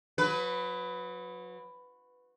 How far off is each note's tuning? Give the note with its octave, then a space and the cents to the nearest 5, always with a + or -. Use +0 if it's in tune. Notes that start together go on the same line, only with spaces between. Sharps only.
F#3 -30 B4 +10